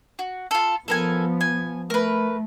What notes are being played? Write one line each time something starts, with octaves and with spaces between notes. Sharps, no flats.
F#4
F4 A4
F3 B3 A4 A#4 G#5
G#5
A3 A#4 B4